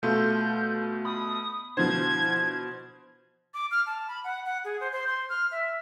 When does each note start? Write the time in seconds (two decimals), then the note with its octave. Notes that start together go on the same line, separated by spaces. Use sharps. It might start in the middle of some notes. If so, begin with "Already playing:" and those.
0.03 B2 A3 F4 A4 C6 G6
1.05 B5 D#6
1.77 B2 D3 E3 F3 C5 G#6
3.54 D6
3.71 F6
3.86 A5
4.08 B5
4.24 F#5
4.45 F#5
4.65 G#4
4.81 C5
4.92 C5
5.07 C6
5.29 F6
5.52 E5